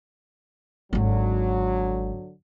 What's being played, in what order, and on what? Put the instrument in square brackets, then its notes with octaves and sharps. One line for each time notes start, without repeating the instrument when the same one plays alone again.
[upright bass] G#1 C4 [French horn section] D3 F#3